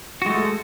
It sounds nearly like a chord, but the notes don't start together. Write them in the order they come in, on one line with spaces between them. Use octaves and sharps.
F#4 G#3 A3